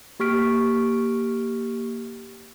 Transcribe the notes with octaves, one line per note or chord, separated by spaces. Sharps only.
A#3 G4 C#6 F6 B6 D7